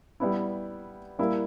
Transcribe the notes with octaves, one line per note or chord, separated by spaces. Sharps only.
G3 B3 E4
G3 A#3 E4